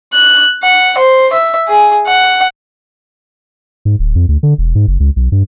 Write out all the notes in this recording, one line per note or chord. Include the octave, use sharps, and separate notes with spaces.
F#6
F#5
C5
E5
G#4
F#5
G#2
D1
F2
D2
D3
E1
G#2
F#1
C#2
B1
G2